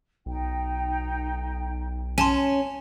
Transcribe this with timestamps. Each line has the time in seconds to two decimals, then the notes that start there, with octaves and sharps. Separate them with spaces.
0.26 B1 D#4 G5
2.18 C#4 G#5 A5 C6